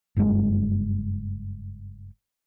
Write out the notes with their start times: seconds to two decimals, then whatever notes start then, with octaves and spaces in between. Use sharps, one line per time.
0.17 F#1 G2 C#3 G#3